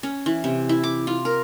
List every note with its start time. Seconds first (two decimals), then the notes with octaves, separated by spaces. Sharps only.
0.03 C#4
0.26 E3
0.44 C3
0.69 E4
0.83 D6
1.07 F4
1.25 A#4